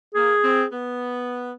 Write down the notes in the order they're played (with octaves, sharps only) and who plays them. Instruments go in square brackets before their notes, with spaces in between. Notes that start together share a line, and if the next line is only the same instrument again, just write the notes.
[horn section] A#3 [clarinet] G#4
[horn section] C4
B3